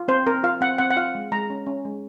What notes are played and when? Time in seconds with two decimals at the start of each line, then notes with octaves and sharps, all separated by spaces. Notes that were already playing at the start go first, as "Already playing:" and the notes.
Already playing: F4
0.08 C4 C5
0.27 C4 A#4
0.44 F4 F5
0.61 C4 F#5
0.78 C4 F#5
0.91 F#5
0.96 F4 F5
1.15 G#3
1.32 G#3 A#5
1.50 C#4
1.66 C#4
1.85 G#3